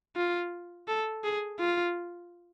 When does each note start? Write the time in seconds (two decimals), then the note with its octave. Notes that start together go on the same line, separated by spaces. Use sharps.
0.16 F4
0.88 A4
1.24 G#4
1.59 F4